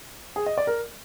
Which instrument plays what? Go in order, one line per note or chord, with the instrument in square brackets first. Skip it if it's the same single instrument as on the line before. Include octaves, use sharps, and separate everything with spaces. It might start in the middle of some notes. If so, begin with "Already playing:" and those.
[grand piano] G#4
D#5
D5
A#4